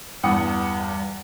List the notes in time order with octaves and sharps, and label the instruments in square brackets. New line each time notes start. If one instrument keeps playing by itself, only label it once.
[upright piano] E2 G2 F#5 D#6 C#7